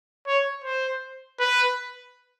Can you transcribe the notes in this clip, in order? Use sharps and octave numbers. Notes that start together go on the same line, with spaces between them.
C#5
C5
B4